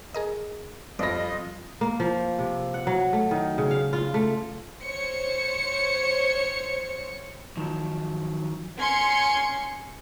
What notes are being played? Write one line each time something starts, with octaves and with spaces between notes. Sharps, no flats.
G#4 A#4 D#5
F2 G3 F4 D5 D#5 B5 A#6
A#3
F3
C3
F#5
F#3
A3
D#3
C#3
F5
F4
A3
C5 C#5 C#7
D#3 F3 F#3
C#4 C6 G#6 C#7